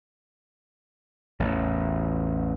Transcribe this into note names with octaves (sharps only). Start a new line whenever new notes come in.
A1 E2